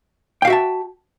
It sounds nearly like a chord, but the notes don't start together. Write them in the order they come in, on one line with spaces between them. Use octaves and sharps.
G5 F5 F#4 E5 A5